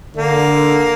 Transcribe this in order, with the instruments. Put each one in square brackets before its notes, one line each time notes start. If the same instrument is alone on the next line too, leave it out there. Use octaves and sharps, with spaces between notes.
[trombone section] D3 [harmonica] A#3